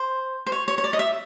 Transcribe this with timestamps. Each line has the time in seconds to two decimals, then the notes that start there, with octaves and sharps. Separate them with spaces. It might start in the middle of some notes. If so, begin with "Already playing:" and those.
Already playing: C5
0.46 C5
0.52 C#5
0.68 C#5
0.78 C#5
0.84 D5
0.93 D#5
0.99 E5